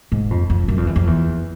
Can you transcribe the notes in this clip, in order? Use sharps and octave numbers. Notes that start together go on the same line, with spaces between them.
G#2
F2
F2
F#2
F2
E2
F2
E2